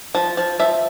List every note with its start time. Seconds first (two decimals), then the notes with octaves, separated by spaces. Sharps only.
0.15 F3
0.37 F3
0.60 F3 E5